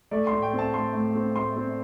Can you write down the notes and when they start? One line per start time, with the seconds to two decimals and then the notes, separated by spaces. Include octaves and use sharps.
0.11 A3 D5
0.27 C6
0.32 A2
0.42 G5
0.53 C4
0.59 A5
0.73 A3 C6
0.94 A2
1.15 C4
1.36 A2 C6
1.57 C4